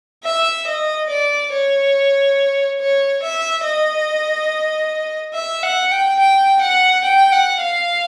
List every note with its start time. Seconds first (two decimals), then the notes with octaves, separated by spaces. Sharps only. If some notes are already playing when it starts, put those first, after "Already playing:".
0.24 E5
0.67 D#5
1.10 D5
1.52 C#5
2.80 C#5
3.23 E5
3.64 D#5
5.34 E5
5.63 F#5
5.91 G5
6.19 G5
6.61 F#5
7.04 G5
7.32 F#5
7.61 F5